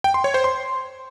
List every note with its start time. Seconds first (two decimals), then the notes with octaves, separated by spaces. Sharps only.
0.04 G5
0.14 C6
0.24 C#5
0.34 C5
0.44 C6